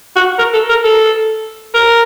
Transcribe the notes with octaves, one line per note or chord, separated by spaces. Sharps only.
F#4
A#4
A4
A#4
A4
A#4